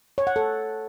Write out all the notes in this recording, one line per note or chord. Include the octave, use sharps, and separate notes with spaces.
C#5
F#5
A4